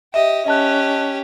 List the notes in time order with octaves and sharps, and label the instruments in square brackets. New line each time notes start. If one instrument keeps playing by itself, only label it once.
[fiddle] G4 D#5 [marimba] E5
[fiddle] C#4 G4 [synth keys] D#5 A5 F#6